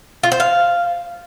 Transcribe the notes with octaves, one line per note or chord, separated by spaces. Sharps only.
F4
C5
F5